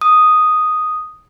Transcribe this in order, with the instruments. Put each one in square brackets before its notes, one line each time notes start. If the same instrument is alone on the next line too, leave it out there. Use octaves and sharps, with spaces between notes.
[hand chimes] D#6